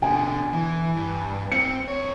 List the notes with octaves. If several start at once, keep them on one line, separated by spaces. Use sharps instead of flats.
B2 D3 G#5
E3
G2
C4 C#7
G2 C#5